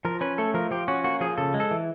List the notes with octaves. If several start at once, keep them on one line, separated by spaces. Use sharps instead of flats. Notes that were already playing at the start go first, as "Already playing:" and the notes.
F3 A#4
C#4 B4
A3 A4
F3 A#4
F3 G4
C#4 F#4
A#3 F#4
F3 G#4
C#3 A4
G#3
A4
E3